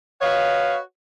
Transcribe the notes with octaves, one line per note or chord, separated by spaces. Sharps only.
F#4 B4 C#5 D#5 F5